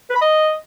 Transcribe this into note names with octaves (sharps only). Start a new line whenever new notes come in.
B4
B5
D#5